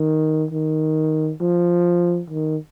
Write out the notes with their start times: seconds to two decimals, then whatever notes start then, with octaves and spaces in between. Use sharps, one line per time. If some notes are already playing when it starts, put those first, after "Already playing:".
Already playing: D#3
0.51 D#3
1.41 F3
2.30 D#3